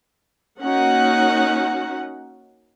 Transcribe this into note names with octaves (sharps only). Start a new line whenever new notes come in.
A#3 C#4 D#4 F#4 F#5